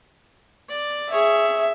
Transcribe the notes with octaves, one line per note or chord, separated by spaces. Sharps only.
D5
G#4 C#5 E5